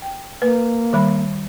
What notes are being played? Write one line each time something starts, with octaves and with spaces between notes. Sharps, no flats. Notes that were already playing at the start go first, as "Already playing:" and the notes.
G5
A#3 B4
D#3 G3 B5